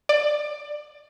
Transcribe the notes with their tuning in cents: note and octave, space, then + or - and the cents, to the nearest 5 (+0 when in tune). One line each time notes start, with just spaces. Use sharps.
D5 +20